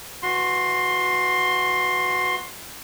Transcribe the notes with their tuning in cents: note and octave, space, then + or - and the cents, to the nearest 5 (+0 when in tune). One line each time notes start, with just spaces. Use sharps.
E3 +0 F#4 -15 C6 +15